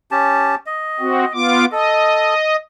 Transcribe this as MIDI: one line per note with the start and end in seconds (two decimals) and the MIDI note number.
0.11 0.55 61
0.11 0.55 67
0.11 0.55 81
0.66 1.33 75
1.00 1.25 60
1.00 1.25 66
1.34 1.65 59
1.34 1.65 65
1.34 1.65 86
1.72 2.34 69
1.72 2.56 75